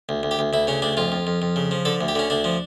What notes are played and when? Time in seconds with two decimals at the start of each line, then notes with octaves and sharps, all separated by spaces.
0.09 D2
0.23 D2
0.31 G4
0.39 D2
0.53 D2 E4
0.67 C#3 C#4
0.82 D2 D4
0.97 F2 F4
1.12 F2
1.27 F2
1.42 F2
1.56 C#3
1.71 F3
1.85 D3 A4
2.01 D2
2.08 G4
2.15 D3 C#4
2.30 D2 D4
2.44 F3